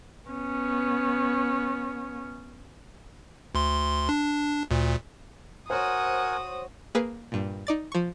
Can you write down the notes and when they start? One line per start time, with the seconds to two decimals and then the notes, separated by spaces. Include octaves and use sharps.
0.29 B3 C#4
3.55 D2 C6
4.09 D4
4.71 D2 A#2
5.70 F#4 A#4 C5 C#5 F#5 G#5 D#6
6.95 A#3 G#4 B4 F5
7.32 G2 A#2
7.67 D#4 D5 A6
7.92 F3 C#6